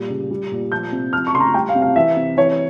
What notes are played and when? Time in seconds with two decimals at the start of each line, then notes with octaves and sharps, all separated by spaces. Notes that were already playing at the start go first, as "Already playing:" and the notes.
Already playing: A#2 G3
0.10 C#3
0.31 G3
0.52 A#2
0.71 F3 G6
0.92 C3
1.13 F3 F6
1.27 C#6
1.34 C#3 C6
1.40 A#5
1.54 G3 G5
1.69 F5
1.75 C3
1.82 F5
1.96 E3 E5
2.16 C3
2.37 E3 C#5